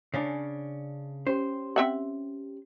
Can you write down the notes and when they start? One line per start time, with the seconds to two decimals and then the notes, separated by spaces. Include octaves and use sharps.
0.14 C#3 C#4 D4
1.27 C#4 G4 C5
1.76 C4 E5 F#5